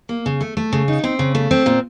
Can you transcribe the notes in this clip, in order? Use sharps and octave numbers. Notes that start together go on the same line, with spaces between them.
A#3
C#3
A3
A3
C#3
D#4
C4
C#3
A3
C4
A#2